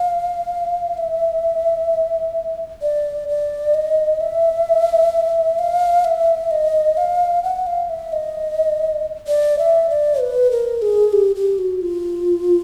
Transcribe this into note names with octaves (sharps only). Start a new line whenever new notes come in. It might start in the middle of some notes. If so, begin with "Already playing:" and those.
Already playing: F5
E5
D5
D5
D#5
E5
F5
E5
D#5
F5
F#5
F5
E5
D#5
D5
E5
D5
B4
A#4
G#4
G4
G4
F#4
F4